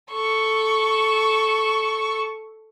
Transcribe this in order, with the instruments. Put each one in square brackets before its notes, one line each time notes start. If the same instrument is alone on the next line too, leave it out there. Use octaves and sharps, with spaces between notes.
[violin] A4 C#6